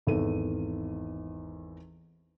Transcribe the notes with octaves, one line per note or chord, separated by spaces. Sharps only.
G#1 E2 A4 D#7